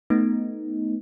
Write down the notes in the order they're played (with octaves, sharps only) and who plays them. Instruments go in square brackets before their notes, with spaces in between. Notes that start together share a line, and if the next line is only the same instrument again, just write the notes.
[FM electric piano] A3 B3 D#4